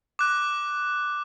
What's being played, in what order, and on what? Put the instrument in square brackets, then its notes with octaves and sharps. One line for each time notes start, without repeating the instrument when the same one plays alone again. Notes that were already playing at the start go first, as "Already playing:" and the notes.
[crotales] D6 F#6